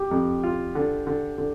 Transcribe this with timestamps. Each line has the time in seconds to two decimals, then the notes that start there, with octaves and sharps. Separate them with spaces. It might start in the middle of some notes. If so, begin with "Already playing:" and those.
Already playing: G4
0.11 F2
0.44 F4
0.75 D3
1.07 D3
1.38 D3